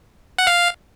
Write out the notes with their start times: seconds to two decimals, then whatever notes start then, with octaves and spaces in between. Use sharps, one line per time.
0.38 F#5
0.47 F5